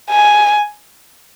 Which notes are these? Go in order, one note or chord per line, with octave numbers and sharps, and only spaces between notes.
G#5